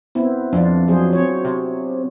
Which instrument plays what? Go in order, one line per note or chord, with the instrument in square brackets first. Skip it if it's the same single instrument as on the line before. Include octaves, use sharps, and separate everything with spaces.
[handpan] B3 C4 E4
[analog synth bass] F2 [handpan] D4 F4
[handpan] F#3 G#4 C5
C4 C#5
[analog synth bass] C3